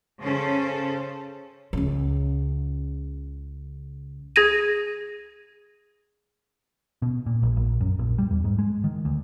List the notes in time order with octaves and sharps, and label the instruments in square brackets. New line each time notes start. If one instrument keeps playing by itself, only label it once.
[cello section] C#3 C#4 A4 C5
[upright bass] C#2 C#3
[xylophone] G#4 G#6 A#6 D#7
[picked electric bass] B2
A#2
A#1
A#1
F#2
A#1
G3
E2
G#2
G#3
D#3
D2